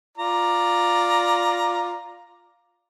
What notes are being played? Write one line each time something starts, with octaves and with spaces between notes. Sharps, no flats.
F4 D5 A#5